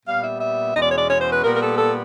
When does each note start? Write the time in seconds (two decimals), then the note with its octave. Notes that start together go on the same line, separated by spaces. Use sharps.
0.06 A#2 G3 B3 F5
0.23 E5
0.41 E5
0.75 E2 B2 G#3 C#4 D#5
0.82 D5
0.90 C#5
0.98 D5
1.10 C#5
1.21 C5
1.33 B4
1.44 A#2 G3 B3 A#4
1.55 A#4
1.61 A4
1.78 A4